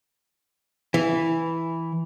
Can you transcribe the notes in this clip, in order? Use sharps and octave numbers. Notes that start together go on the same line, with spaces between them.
E3